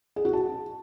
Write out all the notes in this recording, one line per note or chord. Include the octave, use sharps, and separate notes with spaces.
G#4
F#4
A5